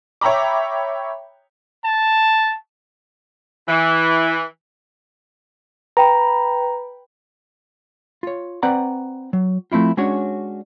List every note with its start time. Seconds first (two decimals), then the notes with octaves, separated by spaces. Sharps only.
0.21 C#5 E5 G5 A#5 B5 D6
1.85 A5
3.68 E3
5.97 B4 G5 A#5 B5
8.23 F4 C#5
8.63 C4 B4 D5 F#5 A#5
9.33 F#3
9.72 F3 A3 C4 E4 F4
9.97 G#3 C#4 D4 F#4 C#5